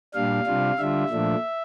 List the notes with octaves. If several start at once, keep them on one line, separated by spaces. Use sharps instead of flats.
A#2 G3 D4 F5
C3 G3 D4 F4
D3 G3 D4 F4 E5
A#2 F3 A3 D4